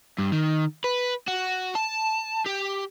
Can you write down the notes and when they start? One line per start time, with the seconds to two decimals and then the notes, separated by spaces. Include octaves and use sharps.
0.18 G2
0.32 D#3
0.84 B4
1.28 F#4
1.75 A5
2.46 G4